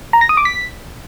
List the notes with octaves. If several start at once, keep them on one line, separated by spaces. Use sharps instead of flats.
A#5
A#6
D#6
D6
B6